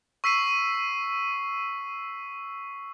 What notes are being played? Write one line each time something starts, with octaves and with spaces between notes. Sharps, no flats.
C#6 E6 B6 C7 D#7